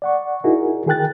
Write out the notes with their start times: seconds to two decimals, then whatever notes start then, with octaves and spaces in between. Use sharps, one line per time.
0.02 D5 F#5 C#6
0.44 D#4 E4 F#4 G#4 A#4
0.86 D#3 G#4 A#4 G5 F#6 A6